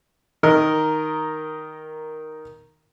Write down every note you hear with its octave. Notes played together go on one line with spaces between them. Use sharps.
D#3 A#4 D#5